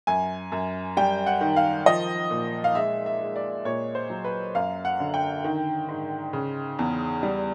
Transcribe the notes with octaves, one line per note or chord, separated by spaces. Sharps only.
F#2 G#5
F#2
G3 G5
F#5
D#3
F5
F3 D#5
A#2
F5
G#3 E5
E5
G#3
D5
A#2 C#5
C5
F#3
B4
F#2 F5
F#5
D3
G5
D#3
G#2
C#3
E2
G3